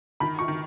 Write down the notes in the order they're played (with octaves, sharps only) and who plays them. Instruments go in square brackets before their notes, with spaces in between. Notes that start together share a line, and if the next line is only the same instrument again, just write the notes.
[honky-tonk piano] D#3 [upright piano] B5
[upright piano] C#6
[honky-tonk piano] D#3